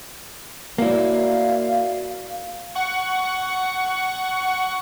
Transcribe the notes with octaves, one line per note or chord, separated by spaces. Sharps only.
A#3 E4 F#4 C#5 D5 F5
F#5 C#6